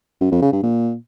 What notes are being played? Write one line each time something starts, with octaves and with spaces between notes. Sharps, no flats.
F#2
F2
C#3
G2
A#2